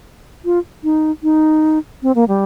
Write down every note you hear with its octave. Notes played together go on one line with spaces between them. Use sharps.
F4
D#4
D#4
C4
A#3
G3